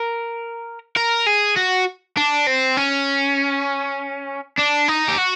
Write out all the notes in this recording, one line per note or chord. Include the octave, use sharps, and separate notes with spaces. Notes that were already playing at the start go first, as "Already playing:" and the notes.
Already playing: A#4
A#4
G#4
F#4
D4
C4
C#4
D4
D#4
G4
F#4